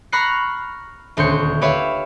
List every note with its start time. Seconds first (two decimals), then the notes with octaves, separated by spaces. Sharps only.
0.12 A#5 B5 C#6 F6 F#6 C7
1.17 D#1 D2 C6 C#6 G6 C#7
1.61 G4 B4 C#5 E5 F5